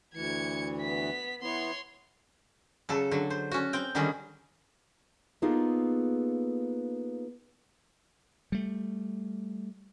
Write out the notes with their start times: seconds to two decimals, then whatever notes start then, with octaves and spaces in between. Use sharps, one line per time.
0.14 D2 E3 G#6 C#7
0.81 B3 B6
1.42 E3 B3 C#5 C6
2.89 C#3 F#3 A4
3.11 D3 F#3
3.30 C5
3.51 C#4 F#4
3.73 C4 G5
3.95 D3 D#3 F#3 G3 C#4 G#4
5.42 A#3 B3 D#4 F4 G#4 A4
8.52 G3 A3